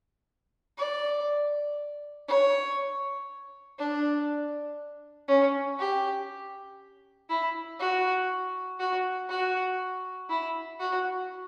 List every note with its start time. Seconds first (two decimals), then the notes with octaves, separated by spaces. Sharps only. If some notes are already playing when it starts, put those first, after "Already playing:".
0.77 D5
2.28 C#5
3.78 D4
5.28 C#4
5.79 G4
7.29 E4
7.79 F#4
8.79 F#4
9.29 F#4
10.29 E4
10.79 F#4